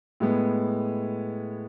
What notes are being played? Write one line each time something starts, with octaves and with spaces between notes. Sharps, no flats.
A2 G#3 B3